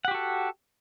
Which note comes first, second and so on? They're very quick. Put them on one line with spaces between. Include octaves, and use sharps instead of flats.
F#5 G4 F#4 A4